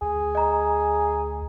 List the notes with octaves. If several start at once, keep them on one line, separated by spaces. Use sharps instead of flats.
D2 G#4
D#5 A#5